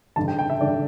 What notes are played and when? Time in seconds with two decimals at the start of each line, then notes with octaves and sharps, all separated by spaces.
0.16 A1 G2 D3 A5
0.28 G5
0.39 G5
0.50 E5
0.61 A1 G2 D3 D5